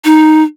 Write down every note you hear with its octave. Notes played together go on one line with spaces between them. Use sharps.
D#4